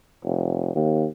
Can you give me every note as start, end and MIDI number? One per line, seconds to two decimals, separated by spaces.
0.25 0.74 29
0.76 1.05 39